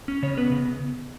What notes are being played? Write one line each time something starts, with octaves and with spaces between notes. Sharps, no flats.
C#4
C#3 C#5
B3 B4
C#3